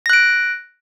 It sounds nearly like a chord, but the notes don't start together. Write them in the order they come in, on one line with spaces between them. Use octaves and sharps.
A#6 F#6 D7